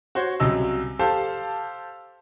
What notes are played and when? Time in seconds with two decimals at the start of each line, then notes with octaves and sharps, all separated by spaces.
0.15 F#4 C5 C#5
0.40 C2 C#3 F#3 D#5 E6
0.99 G4 A4 C5 F5 A5